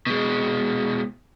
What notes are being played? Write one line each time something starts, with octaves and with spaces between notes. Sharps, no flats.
B2 G#3